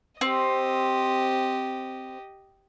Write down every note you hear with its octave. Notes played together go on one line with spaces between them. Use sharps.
C4 G4 D#5